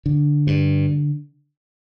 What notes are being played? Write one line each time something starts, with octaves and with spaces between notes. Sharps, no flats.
D3
G2